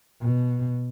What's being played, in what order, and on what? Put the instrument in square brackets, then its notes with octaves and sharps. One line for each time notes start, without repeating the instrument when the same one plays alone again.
[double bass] B2